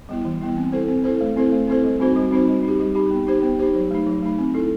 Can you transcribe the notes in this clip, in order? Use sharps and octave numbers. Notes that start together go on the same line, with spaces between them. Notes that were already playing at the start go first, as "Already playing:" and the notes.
G3 B3 E4
E3
G3 B3 E4
C4
E4 A4 C5
C4
E4 A4 C5
A3
C4 E4 A4 C5
A3
C4 E4 A4 C5
G3
C4 D#4 F#4 C5
G3
C4 D#4 F#4 C5
G3
D#4 G4
G3
D#4 G4
B3
D#4 G4 C5
B3
D#4 G4 C5
F#3
A3 D#4
F#3
A3 D#4
C4
E4 A4